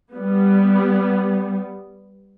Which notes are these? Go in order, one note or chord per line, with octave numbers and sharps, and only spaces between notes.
G3 B3